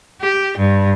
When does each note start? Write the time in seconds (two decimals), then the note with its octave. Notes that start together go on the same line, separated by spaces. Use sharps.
0.21 G4
0.57 G2